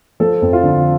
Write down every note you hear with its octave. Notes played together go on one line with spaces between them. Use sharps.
F3 A4
F2
F4
D3